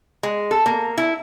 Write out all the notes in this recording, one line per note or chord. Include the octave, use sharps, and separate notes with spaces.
G#3
A4
A#3
E4